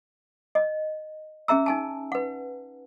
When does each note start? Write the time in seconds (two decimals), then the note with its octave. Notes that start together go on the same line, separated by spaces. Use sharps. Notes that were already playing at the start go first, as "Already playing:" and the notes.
0.55 D#5
1.48 C#4 G#4 E5 A#5 E6
1.66 D#4 G#5 A5
2.12 B4 F#5